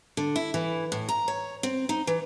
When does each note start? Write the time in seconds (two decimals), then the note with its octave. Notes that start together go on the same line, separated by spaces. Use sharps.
0.17 D3
0.36 E4
0.54 E3
0.92 A2
1.09 A#5
1.28 C#5
1.63 C4
1.89 D#4
2.07 E3